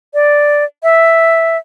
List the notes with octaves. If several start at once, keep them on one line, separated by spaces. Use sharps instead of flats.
D5
E5